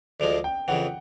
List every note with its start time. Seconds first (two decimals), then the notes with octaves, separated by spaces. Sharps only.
0.20 D2 D3 F3 G#3
0.44 G5
0.68 F2 C#3 E3 F#5